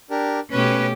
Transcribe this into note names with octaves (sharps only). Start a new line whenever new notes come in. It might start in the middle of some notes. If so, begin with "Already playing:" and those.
D4 G4 A#4
B2 A3 C#4 G4 B4